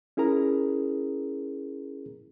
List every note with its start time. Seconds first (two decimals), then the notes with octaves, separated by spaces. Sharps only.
0.17 C#4 E4 G#4 A#4 A#5